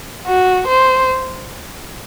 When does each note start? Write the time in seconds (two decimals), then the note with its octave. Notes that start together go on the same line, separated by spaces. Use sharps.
0.27 F#4
0.67 C5